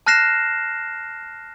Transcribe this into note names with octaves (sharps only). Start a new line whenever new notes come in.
A5 F6 F#6 A#6 C7 E7